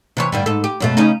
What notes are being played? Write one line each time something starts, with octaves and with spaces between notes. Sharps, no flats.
C3 E3 C#5
G2 D3 G3
G#2 A4
G4
F#2 B2 A3
C#3 C#4 D#4